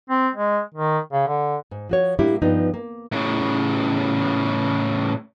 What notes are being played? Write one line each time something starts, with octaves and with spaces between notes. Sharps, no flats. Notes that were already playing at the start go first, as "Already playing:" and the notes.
C4
G#3
D#3
C#3
D3
G#2
F3 F#4 C#5
A2 G3 A#3 D4 E4 G4
G2 F3 B3 D#4
A#3
A2 C#3